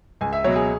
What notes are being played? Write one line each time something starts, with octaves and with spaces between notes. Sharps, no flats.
C#2 G#5
E5
B2 F#3 C#5
G#4